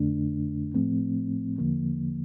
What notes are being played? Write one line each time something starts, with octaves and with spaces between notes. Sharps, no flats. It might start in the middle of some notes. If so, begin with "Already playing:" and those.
Already playing: F2 D3 A3 D4
A2 F3 A3 C4
E2 D3 F3 A#3